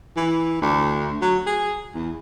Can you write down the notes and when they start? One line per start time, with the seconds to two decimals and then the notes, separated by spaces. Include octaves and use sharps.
0.17 E3
0.62 D2
1.22 F#3
1.47 G#4
1.95 E2